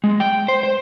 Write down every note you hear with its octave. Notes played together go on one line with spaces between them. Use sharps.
G#3
G5
C5
C5